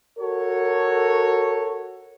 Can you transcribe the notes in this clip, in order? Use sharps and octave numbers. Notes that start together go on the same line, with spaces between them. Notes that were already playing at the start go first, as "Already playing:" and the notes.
F#4 A4 A#4 C#5